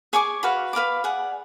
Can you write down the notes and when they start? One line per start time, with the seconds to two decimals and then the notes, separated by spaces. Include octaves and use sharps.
0.13 G#4 C#5 G#5 D6
0.43 F#4 B4 F5 B5
0.73 B4 F5 B5 D6
1.04 G#4 D5 F#5